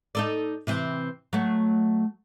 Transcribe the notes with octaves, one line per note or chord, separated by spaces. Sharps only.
D#4 A4 D5
C3 E3 C4
F#3 A3